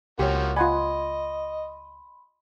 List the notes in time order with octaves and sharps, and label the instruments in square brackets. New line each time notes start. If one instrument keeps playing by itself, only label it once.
[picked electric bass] C#2 [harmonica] F3 A#3 F#4 [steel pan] G4 C#5
[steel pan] F4 F#5 G#5 [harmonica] D#5 [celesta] B5 C6